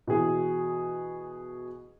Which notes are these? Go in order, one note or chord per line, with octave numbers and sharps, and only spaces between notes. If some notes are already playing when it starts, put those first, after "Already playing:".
B2 E3 G#4